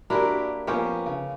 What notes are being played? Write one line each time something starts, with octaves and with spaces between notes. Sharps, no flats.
A#3 D4 E4 F#4 G4 A#4
F3 A#3 B3 C#4 G4
C#3